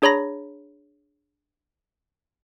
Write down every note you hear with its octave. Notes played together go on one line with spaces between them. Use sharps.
D4 G#4 C#5 A#5 B5 A#6